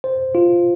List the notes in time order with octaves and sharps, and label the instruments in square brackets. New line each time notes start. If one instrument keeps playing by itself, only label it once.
[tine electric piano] C5
F4